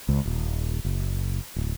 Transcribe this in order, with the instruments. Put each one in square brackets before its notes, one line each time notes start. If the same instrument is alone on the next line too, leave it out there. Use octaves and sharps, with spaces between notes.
[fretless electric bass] C#2
D#1
F#1
D1